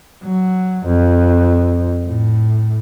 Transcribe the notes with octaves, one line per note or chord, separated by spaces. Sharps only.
F#3
F2
A2